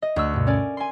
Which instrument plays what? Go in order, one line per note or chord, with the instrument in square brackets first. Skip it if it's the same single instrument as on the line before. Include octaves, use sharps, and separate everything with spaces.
[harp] D#5
D2 C#6 E6 F#6
G2 B2
C#4 A#4 D5 G#5
G#5 C6